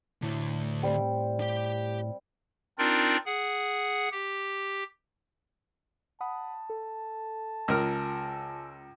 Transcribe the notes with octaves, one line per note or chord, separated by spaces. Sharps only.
A2 D3 A3
G3 C4
G4 G5
C4 D4 D#4 F4 A#4 D5
G#4 F#5
G4
F#5 A5 B5 D#6
A4
C#2 F4 A#4 G#5 E6 F6